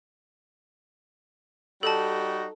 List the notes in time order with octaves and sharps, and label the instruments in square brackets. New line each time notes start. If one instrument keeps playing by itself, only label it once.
[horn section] G3 D#4 F#4 [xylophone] A4 A5